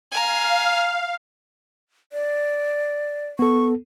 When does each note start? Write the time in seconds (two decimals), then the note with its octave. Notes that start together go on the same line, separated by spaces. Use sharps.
0.12 F5 G#5 A#5
2.13 D5
3.39 B3 A4 C#6